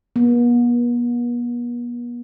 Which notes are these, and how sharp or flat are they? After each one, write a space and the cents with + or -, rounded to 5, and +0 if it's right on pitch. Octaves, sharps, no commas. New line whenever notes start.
B3 -45